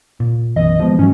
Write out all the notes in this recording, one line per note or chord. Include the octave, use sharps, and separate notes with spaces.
A#2
B1 F#2 E3 D#5
E3 F3 G#3 B3
G#2 F3 F#3 C#4